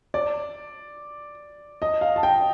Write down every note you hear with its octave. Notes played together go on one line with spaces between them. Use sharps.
D5
D#5
F5
A5
G5